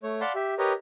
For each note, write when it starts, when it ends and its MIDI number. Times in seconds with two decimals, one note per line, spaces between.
0.03 0.21 57
0.03 0.21 73
0.21 0.32 74
0.21 0.32 77
0.21 0.32 78
0.21 0.32 81
0.21 0.32 83
0.21 0.32 84
0.35 0.54 67
0.35 0.54 76
0.58 0.73 67
0.58 0.73 70
0.58 0.73 71
0.58 0.73 73
0.58 0.73 75